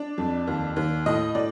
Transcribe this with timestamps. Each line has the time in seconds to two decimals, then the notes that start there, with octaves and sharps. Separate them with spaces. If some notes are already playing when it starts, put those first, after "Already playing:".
Already playing: D4 D5
0.18 F2
0.47 D#2
0.76 D#2
1.06 A2 D#5
1.35 A2 D5